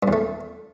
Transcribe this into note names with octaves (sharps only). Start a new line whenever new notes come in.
G2
E2
A3